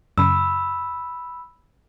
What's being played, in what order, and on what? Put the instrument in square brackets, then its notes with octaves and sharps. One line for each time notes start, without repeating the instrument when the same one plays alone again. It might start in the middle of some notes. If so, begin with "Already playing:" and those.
[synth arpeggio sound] F#2 C#3 [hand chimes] B5 E6